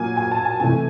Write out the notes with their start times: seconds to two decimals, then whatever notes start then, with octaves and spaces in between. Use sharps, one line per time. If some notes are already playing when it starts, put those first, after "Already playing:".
Already playing: A#2 F#3 A#3 G#5
0.17 G#5
0.31 A5
0.45 G#5
0.60 C3 E3 A3 G#5